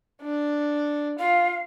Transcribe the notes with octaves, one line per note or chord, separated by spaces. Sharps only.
D4
F4 F5